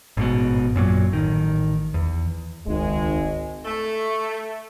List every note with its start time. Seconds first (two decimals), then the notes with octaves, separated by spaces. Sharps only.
0.17 A1 G#2 B2
0.75 F#2 A#2 F#3
1.12 A1 D#3
1.94 E2
2.67 D#1 G#1 C#2 G#3
3.65 A3